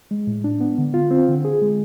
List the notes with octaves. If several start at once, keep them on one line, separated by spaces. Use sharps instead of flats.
G#3
A2
D4
B3
D3
F4
C4
D3
G#4
G#3